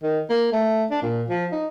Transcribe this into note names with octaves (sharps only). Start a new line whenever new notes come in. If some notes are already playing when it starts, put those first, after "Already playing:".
D#3
A#3
A3
D4
A#2
F3
D#4